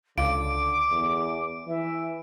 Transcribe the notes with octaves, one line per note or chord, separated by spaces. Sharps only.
C#2 D3 F4 D6 D7
E2
E3 E5